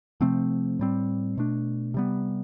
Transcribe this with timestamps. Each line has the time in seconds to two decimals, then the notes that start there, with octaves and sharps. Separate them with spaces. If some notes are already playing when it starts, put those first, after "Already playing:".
0.21 C3 F3 A3 C4
0.79 A2 G3 C4
1.37 B2 A3 D4
1.94 C3 G3 B3